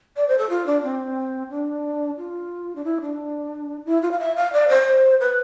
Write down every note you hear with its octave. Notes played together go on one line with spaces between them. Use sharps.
D5
C5
A4
F4
D4
C4
D4
F4
D4
E4
D4
E4
F4
F5
E5
F5
D5
C5
B4